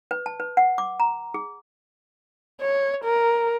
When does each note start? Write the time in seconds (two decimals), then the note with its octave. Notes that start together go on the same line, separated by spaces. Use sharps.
0.11 B4
0.26 A5
0.40 B4
0.57 F#5
0.78 D6
1.00 A#5
1.34 G#4
2.61 C#5
3.04 A#4